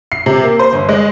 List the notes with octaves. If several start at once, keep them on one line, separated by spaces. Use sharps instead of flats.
C7
C3
A#3
C5
G1
G#3